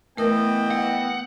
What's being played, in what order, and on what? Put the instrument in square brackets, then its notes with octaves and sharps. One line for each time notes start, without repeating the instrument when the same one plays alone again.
[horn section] E3 D#5 G5 [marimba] A3 A#4 [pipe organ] B3
[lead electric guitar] F#5